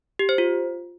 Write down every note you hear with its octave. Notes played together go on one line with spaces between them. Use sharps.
G4
C5
F4